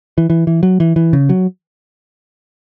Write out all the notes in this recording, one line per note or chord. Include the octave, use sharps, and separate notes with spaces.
E3
E3
E3
F#3
E3
E3
C#3
F#3